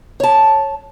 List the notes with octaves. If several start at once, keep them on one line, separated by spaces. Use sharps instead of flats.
C#5 A5